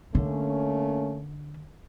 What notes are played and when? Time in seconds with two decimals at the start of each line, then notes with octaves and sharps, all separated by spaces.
0.15 D3 A3 A#3 C#4